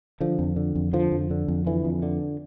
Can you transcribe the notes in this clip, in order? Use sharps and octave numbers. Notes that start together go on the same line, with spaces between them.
D3 F3
F2
D3
F2
D3 F3
F2
D3
F2
D3 E3
F2
D3